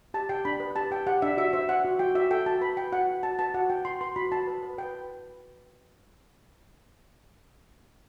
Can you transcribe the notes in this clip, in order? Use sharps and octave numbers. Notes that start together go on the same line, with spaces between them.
G4 A5
G4 G5
D4 B5
B4
G4 A5
G4 G5
G4 F#5
D4 E5
F#4 E5
C5 E5
C5 F#5
F#4
F#4 G5
F#4 E5
A4 G5
F#4 A5
B4 B5
B4 G5
F#4 F#5
F#4
F#4 A5
B4 A5
F#4 F#5
F#4 G5
F#4 C6
B4 C6
F#4 B5
F#4 A5
B4
B4
B4 G5